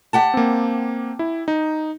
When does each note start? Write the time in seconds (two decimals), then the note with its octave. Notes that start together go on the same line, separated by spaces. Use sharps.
0.13 G4 F#5 A5
0.34 A#3 C4
1.19 E4
1.48 D#4